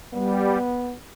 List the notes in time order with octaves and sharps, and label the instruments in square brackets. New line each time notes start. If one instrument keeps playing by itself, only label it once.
[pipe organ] G3 [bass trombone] B3